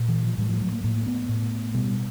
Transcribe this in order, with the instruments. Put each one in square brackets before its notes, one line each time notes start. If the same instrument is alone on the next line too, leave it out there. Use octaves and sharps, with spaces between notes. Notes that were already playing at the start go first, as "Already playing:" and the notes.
Already playing: [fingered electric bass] A#2
E3
F3
A2 G3
F3
F#3
A#3
A2 A#3
B3
A2
B2 G3